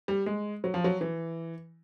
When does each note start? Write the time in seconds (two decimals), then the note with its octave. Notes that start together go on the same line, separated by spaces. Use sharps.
0.08 G3
0.26 G#3
0.64 F#3
0.74 F3
0.84 F#3
1.01 E3